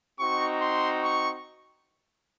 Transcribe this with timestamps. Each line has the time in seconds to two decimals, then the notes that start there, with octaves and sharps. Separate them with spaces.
0.19 C4 D#4 F#4 C#6
0.61 C6
1.03 C#6